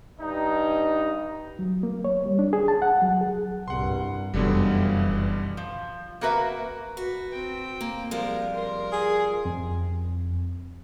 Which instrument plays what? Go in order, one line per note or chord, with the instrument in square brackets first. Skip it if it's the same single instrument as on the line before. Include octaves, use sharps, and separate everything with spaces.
[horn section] G2 D#4
[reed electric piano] F#3
A#3
C#5
G3
D4
G#4
A5
F#5
F#3
G#4
[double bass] C2 G2 [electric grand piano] F#5 C6
[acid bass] F1 [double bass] F#2 E3 [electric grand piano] B2 D3 G3
[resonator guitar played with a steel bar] F3
A#3 F#4 A#4 B4 E5
[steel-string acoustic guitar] F#4 [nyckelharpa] B4
[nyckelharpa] C4 G5
[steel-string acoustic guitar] A#3
[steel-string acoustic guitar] F3 G3 G#3 [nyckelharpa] A#4
[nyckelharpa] A#4 C6
[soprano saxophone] G#4
[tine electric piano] F2